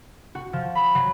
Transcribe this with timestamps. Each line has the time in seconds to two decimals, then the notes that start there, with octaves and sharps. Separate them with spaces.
0.35 F#4
0.53 F3
0.75 B5
0.95 F#3